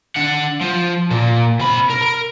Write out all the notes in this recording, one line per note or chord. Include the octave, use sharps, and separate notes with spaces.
D4 F#5
F3
A#2
C3 B5
A#4
A#4